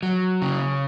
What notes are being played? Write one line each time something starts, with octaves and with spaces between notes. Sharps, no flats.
F#3
C#3